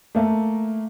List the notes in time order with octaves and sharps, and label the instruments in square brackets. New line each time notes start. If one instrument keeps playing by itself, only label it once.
[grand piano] A3 A#3